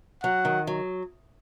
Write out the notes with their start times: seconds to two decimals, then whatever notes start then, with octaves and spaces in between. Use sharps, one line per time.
0.23 F#3 F#5
0.45 D#3
0.67 F#3